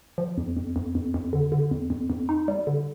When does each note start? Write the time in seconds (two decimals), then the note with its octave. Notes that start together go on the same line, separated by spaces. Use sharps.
0.18 F3
0.38 F2
0.57 F2
0.76 F2
0.95 F2
1.14 F2
1.33 D3
1.52 D3
1.71 F2
1.90 F2
2.10 F2
2.29 D#4
2.48 G3
2.67 D3